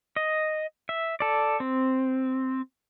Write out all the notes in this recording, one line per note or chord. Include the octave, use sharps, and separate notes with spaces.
D#5
E5
A4 D5
C4